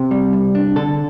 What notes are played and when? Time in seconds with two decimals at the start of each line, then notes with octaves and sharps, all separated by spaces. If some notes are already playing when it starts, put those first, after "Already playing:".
Already playing: C3 G4
0.11 G3
0.33 C2
0.55 D4
0.76 D3 A4